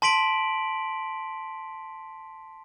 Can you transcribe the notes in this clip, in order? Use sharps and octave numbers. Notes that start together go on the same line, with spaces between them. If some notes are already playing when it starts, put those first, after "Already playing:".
A5 C6 B6 D7 F#7